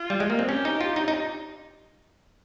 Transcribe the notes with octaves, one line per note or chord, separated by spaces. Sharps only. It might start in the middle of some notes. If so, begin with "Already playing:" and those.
Already playing: F4
G3
G#3
A#3
C4
C#4 G4
D#4
F4
D#4
D#4